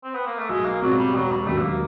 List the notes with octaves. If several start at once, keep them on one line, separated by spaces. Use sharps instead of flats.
C4
B3
A#3
A3
B1 G#3
A#3
B2 F#3 G#3 C4 F4
G3
E1 F#3
G3
D#2 D3 F#3 A3
B3
A#3